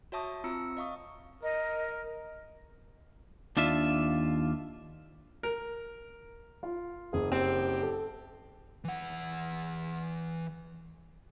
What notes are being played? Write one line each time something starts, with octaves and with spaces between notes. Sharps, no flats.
F#4 C#5 E5 A5 C#6 D#6
C4 F4 A#5 E6 C#7
D#5 F5 C#6 D#6
A#4 D#5
D#2 D4 F4 E5
A#4
F4
F#1 G#4
C4 G4
A4
E3 F#5